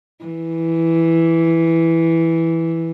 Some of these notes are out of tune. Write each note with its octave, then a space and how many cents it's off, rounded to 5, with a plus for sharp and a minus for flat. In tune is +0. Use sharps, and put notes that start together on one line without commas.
E3 +0